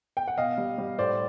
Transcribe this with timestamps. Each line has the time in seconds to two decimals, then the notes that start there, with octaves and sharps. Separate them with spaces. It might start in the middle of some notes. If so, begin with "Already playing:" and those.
0.17 G5
0.28 F#5
0.38 B2 D#5 F5
0.58 G3
0.78 G3
0.98 A2 C5 D5